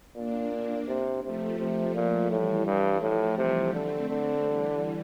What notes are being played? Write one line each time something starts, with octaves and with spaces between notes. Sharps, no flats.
A#2 A#3 D4
A#3 D4
C3
C3 F3 A3
C3
A#2 F3 A3
A2 E3 G3
G2
A2 F3 A3
C3 E3 G3
D3 A3 C4
D3
E3 G3